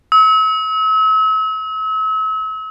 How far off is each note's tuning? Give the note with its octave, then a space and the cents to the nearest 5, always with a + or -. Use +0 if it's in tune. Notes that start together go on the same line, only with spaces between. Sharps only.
E6 -40